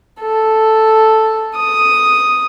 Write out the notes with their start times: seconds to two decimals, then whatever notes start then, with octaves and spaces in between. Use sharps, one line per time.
0.21 A4
1.57 D#6